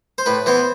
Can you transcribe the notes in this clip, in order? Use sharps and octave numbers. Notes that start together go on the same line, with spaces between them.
C5
A2 B4
E3 B3 C5